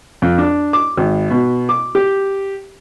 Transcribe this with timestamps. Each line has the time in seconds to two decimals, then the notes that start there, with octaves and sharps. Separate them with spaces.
0.22 F2
0.38 D4
0.73 D6
0.97 G#1
1.30 B2
1.69 D6
1.95 G4